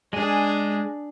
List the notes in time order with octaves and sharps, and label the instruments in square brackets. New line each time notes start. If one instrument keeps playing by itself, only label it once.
[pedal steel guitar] G#3 G#5 [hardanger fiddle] D4 G#4